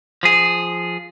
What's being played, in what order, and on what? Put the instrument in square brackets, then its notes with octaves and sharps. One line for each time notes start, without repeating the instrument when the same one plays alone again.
[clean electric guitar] F3 G#4